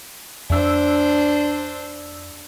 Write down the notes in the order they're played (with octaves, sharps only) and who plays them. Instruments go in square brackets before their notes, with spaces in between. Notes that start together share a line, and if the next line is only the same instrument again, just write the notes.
[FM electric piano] F2 E6 [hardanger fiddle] D4 C5